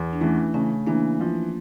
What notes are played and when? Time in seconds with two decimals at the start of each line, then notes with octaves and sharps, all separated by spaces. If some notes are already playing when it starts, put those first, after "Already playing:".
Already playing: E2
0.13 D4
0.21 E3 A3 C#4
0.54 C#3 A3 C#4
0.87 E3 A#3 D4
1.20 F3